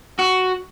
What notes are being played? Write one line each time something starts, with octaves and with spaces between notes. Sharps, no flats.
F#4